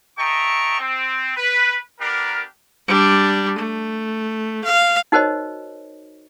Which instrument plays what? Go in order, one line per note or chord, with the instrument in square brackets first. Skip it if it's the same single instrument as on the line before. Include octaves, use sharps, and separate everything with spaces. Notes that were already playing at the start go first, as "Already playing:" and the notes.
[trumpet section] A4 D#5 E5 G5 A#5 C#6
C4
B4
B3 D4 G4 A#4
[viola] G3 D4
A3
F5
[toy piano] D#4 F#4 A#4 C5 C#5 D#5